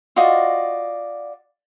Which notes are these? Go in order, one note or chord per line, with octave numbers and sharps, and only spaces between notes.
F4 F#4 D5 D#5